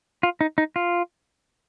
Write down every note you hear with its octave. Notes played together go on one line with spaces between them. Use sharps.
F4
D#4
D#4
F4